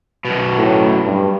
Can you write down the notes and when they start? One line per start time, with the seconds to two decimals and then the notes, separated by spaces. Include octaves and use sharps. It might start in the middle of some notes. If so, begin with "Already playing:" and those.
0.25 F#2 B2
0.58 A2
1.05 G2